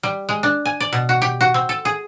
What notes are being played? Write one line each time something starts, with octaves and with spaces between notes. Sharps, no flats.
G3
G#3
D4
G#5
D5
B2
F#4
G4
F#4
C4
A4
G#4